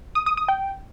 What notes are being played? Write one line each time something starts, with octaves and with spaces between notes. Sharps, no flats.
D#6
D#6
D#6
G5